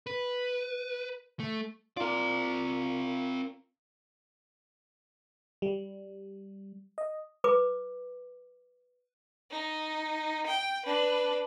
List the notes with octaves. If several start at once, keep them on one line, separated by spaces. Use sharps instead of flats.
B4
A3
C4 F4 A#4 D5
G3
D#5
B4 D6
D#4
G5
D4 B4